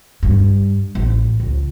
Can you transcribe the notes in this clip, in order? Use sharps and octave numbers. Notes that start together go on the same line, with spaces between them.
G2
A1
C#2